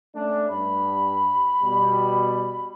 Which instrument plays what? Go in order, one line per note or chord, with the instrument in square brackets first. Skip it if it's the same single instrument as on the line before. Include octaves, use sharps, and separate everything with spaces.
[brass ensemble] A3 C#4 D4
[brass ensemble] G2 [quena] B5
[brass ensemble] B2 G3